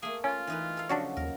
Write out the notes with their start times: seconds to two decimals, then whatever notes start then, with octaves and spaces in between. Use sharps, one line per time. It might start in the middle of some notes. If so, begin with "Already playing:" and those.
0.02 A3 A#3 G#4
0.24 C#4 F4
0.47 E3 D#4 B4
0.77 A4 F5
0.89 C#3 F3 F#3 D4 F#4 C#5
1.17 D#2 A#4